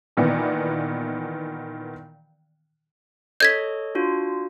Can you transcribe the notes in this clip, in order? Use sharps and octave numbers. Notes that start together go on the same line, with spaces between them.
A#2 D#3 E3 B3 D5
A4 C#5 D#5 G6 G#6 B6
D4 F4 F#4